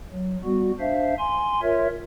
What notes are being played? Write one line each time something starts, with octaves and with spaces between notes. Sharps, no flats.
F#3
G3 B3 F#4
D4 C5 E5 F5
G#5 C6
F4 A#4 C#5 E5